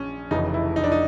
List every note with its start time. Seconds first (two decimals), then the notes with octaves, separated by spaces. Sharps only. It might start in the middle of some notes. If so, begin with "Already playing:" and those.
Already playing: A#1 C#4
0.31 F1 F2 C#3 E3 D#4
0.54 E4
0.76 D#4
0.84 D4
0.92 D#4